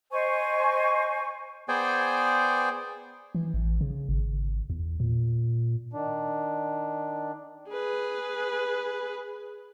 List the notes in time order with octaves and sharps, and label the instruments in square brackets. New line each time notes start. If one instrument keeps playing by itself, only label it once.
[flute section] C5 D#5 G#5 C#6
[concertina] B3 G#4 C5 D5 G5 G#5
[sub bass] E3
A1
C#3
G#1
E2
A#2
[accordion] D#3 D4
[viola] G#4 B4